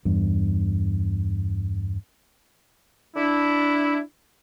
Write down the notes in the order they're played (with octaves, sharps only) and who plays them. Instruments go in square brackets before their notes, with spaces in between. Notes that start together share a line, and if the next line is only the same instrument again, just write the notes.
[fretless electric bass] E2 G2
[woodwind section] D4 E4